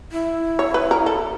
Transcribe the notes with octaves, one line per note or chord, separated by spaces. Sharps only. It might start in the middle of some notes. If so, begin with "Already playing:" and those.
E4
C#5
B4
A#4
A4